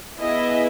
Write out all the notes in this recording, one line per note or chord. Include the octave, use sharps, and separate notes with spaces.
B3 E4 G#4 D#5